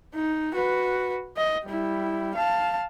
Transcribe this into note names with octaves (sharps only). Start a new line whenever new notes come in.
D#4
F#4 B4
D#5
G3 E4
F5 A5